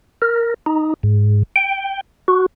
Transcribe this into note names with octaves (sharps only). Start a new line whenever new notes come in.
A#4
D#4
G#2
G5
F#4